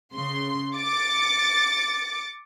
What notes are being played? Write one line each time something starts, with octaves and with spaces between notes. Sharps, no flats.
C#3 C6
D6 A6 C#7